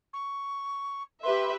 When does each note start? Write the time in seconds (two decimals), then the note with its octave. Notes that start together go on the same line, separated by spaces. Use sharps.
0.13 C#6
1.23 G4 B4 E5 C6